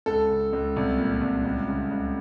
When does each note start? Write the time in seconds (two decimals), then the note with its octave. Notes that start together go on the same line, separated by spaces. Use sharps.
0.06 C#2 A4
0.29 C#3
0.53 C#2
0.76 C2
0.98 A#2
1.21 C2
1.45 C#2
1.68 C#3
1.91 C#2